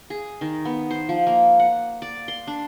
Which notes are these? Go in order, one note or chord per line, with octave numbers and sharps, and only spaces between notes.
G#4
D#3
B3
C5
F3
A#3
F#5
D5
C6
D4